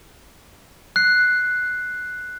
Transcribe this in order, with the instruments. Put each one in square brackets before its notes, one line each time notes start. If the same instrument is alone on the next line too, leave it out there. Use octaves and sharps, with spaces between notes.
[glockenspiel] F#6 C7